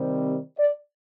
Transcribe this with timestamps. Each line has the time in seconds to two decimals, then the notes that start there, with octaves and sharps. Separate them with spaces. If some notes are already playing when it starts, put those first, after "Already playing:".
Already playing: C3 D#3 G3 C4
0.58 D5